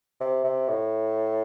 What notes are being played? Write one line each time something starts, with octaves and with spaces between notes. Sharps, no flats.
C3
C3
A2